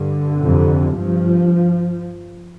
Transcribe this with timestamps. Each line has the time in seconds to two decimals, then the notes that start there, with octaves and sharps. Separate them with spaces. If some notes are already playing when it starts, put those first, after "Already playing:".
Already playing: G2 D3
0.39 F2 C3
0.96 G2 F3